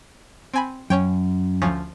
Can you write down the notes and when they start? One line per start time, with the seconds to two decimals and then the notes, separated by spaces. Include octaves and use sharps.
0.54 C4 G#5 B5
0.90 F#2 C#4 C#5 G5
1.62 D2 F3 C#4